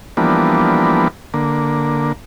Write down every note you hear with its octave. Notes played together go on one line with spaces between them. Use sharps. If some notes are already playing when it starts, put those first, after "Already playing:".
E3 F3 G3 A#3 B3 D4
D3 A#3